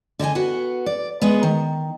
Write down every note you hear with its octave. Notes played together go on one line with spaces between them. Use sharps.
D3 D#5 G5 G#5
B3 F#4
D5
G#3 B3
D#3